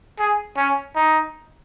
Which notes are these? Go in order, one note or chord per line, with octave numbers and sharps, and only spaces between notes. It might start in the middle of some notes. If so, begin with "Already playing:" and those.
G#4
C#4
D#4